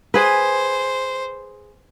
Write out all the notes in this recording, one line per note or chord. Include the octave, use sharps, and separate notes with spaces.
G#4 B4 C5